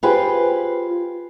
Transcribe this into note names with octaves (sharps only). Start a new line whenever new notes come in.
F4 G4 G#4 B4 C5 G5